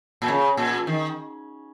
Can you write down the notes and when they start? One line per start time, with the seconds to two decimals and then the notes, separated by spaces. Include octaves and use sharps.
0.22 A#2
0.28 C#3
0.57 A#2
0.87 D#3